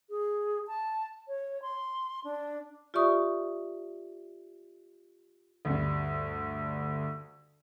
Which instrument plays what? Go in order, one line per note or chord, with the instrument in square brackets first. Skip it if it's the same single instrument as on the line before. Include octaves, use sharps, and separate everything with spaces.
[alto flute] G#4
A5
C#5
C6
D4
[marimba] F4 G4 D5 E5 C#6 D#6
[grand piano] D2 G2